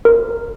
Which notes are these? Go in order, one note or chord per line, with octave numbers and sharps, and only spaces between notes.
A#4